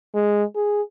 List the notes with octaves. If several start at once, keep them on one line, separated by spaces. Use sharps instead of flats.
G#3
G#4